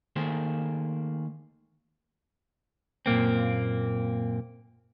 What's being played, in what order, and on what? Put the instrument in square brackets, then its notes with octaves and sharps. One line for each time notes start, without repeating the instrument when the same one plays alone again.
[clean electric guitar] D#3 A3 A#3 G#4 C5
F#2 A#2 A#3 C4